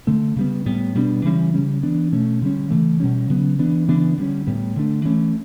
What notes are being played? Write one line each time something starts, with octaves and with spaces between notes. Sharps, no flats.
D3 A3 C#4
C#3 G3 B3
A2 G3 B3
B2 G3 B3 D4
C#3 E3 G3 C#4
C#3 G3 C#4
E3 B3 D4
B2 A3 C#4
D3 G3 C#4
C#3 E3 A3
B2 G3 C#4
C#3 F#3 B3
E3 B3 D4
C#3 E3 B3 D4
D3 G3 C#4
A2 G3 B3
D3 A3 D4
E3 A3 C#4